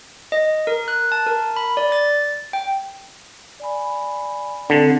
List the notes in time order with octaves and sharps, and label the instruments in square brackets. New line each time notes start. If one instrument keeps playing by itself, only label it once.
[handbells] D#5
A#4
F#6
A5
A#4
B5
D5
A6
G5
[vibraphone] D5 G#5 B5
[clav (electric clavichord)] D3 [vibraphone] C4 A5 [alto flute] D4